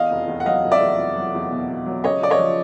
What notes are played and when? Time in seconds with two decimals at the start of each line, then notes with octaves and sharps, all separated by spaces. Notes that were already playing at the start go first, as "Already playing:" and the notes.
Already playing: E2 D#5 F5
0.10 F1
0.28 E2
0.40 F#5
0.46 F#3 D#5 F5
0.64 F1
0.72 D5 E5
0.81 E2
0.98 F1
1.16 F#3
1.34 E2
1.51 B2
1.69 B2
1.86 F#3
2.04 C#3 C#5 D#5
2.21 C#3 D5
2.30 C#5 D#5
2.39 F3